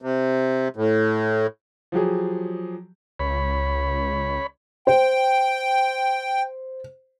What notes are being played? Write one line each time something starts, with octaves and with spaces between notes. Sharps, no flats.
C3
A2
F3 F#3 G4 G#4
C#2 C#5 B5
C5 G5